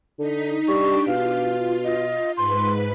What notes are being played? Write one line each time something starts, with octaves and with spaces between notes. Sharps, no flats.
D3 D#4 B6
G3 D4 G4 C#6
B2 F4 F5
D#5
G#2 B4 B5 C6